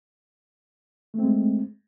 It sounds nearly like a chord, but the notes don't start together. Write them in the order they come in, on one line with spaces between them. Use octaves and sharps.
A3 C4 G#3